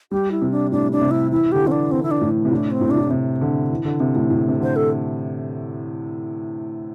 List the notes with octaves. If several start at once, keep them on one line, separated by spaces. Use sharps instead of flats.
G3 G4
E4
C3
D4
A2 D4
D4
C3
E4
E3 E4
D3 G4
E3
C4
D4
E3 C4
E4
D4
A2
C3
A2 D4
C4
A2
C3 D4
A2
C3
D3
E3
D3
C3
A2
A2
C3
D3 C5
A4